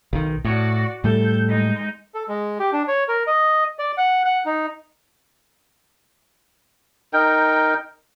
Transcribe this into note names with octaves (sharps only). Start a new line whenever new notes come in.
B1 D#3
A2 F#4 D5
A2 G3 A3 A4 G6
G#3 D#4 G6
A4
G#3
G4
D4
C#5
A#4
D#5
D5
F#5
F#5
D#4
D#4 A#4 G5